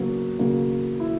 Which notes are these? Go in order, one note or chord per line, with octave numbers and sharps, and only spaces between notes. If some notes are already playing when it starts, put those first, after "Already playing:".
Already playing: C#3 F#3 A#3 B3
C#3 F#3 A#3
E4